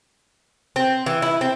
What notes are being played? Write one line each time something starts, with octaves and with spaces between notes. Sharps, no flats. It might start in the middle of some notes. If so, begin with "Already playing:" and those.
C4
E3
E4
C4